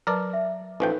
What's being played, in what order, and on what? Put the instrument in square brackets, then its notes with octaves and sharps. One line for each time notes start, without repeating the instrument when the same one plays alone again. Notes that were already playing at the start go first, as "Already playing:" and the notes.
[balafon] F#3 B4 A5 [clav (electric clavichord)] A#4 D5
[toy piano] E5
[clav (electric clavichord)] A1 F3 G5 [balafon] D#4 A4 G#5 [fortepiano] B4